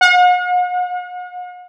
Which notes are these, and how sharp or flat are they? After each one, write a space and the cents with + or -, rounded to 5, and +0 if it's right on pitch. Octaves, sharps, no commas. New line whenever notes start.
F#5 -45